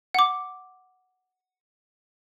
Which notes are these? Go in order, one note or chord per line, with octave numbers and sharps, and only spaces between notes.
F#5 D6